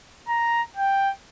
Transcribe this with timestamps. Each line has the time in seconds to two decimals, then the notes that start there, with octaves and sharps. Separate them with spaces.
0.28 A#5
0.76 G5